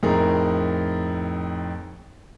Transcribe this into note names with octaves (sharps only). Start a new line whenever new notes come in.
F2 A2 D#4 G#4 A#4